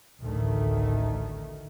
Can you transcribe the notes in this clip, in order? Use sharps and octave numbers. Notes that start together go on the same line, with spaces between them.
A1 D2 D#3 A3